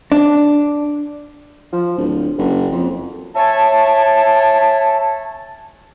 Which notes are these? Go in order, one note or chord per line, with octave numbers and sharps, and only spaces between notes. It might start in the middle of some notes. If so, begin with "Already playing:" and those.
D4
F3
D1
F#1
F2
C#5 E5 G#5 A5